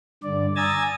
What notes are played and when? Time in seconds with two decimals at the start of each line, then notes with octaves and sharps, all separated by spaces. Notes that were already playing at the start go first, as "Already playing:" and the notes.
0.23 G2 D3 D5
0.56 G#5 A#5 D#6 E6 G#6 A6